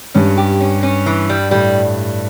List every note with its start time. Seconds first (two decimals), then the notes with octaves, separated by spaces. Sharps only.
0.15 G2 C#4
0.38 G4
0.60 C#4
0.83 C#4
1.06 E3
1.29 G3
1.51 A2 G3